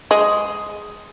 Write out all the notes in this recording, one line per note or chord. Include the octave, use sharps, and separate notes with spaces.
G#3 G#4 D#5